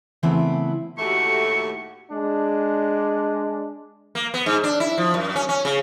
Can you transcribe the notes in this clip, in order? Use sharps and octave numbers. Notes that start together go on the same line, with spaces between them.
C#3 E3 A3 B3 C4 E4
D#2 A2 A3 F#4 G4 C#6
G#3 D4
A#3
B3
G#2
D4
E4
F3
F#2
C#4
C#4
C#3